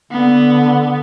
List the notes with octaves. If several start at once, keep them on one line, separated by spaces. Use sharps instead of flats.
D3 B3